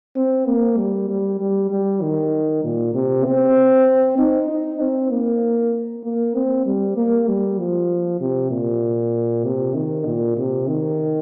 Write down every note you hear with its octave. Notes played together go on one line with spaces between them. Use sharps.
C4
A#3
G3
G3
G3
G3
D#3
A#2
C3
C4
D#4
D#4
C4
A#3
A#3
C4
G3
A#3
G3
F3
C3
A#2
C3
D#3
A#2
C3
D#3